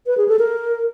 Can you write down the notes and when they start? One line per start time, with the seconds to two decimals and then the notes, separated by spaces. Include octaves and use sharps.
0.07 B4
0.17 G#4
0.28 A4
0.39 A#4